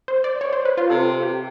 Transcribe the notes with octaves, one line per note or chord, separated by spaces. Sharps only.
C5
D5
C#5
C5
B4
F4
C3 A4
G4